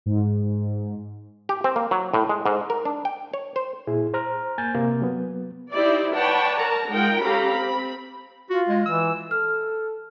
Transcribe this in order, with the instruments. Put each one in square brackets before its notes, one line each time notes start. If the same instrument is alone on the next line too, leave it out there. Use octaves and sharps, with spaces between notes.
[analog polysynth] G#2
[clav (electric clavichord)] G4
C4
A#3
F#3
A2
G#3
G#2
A#4
D4
G5
C#5
C5
[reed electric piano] A#2 E4 G#4
C5 A#5 F6
A#3 G#5 G6 A6
C3 A#3
F#3 B3
[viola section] D#4 E4 G4 C5 D5
B4 C#5 D5 F#5 G5 A5
A#4 A5 A#5
G#3 D#4 F4 A#4 F#5 G5
C#4 G4 A4 F5 A#5 B5
C4 B5
[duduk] F4 [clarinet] F#4
[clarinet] G#3
[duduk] E3 [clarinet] E6
[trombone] A4 [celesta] F6